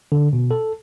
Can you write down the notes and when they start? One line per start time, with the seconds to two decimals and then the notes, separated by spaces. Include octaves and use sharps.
0.12 D3
0.33 B2
0.51 A4